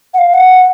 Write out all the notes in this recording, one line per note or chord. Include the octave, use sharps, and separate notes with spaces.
F#5
F5
F#5